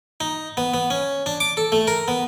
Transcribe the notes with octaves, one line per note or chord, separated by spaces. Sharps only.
D#4
B3
B3
C#4
D4
D6
A4
A3
A#4
B3